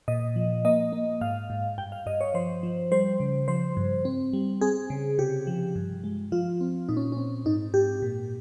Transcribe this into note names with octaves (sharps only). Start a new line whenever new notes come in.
A#2 D#5
F3
A#3 D#5
A#3
G#2 F5
G#2
G2 G5
F5
G2 D#5
C#5
F3 C5
F3
G3 C5
C#3
F3 C5
G2
C4
G3
C4 G#4
C#3
C3 G4
F3
G2
G#3
F3 F4
C4
A#2 D#4
C#4
C4 C#4
G#2 D#4
G#2 G4
A#2